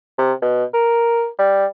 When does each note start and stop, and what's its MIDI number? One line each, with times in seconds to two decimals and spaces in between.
0.18 0.33 48
0.42 0.64 47
0.74 1.27 70
1.39 1.66 55